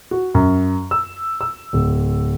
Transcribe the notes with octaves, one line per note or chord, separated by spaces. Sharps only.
F#4
F#2
E6
E6
D1